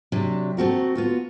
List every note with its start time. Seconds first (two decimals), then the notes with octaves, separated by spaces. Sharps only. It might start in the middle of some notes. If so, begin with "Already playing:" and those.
0.12 C3 F#3 D4
0.57 A3 C4 F#4 A#4
0.95 B3 F4 F#4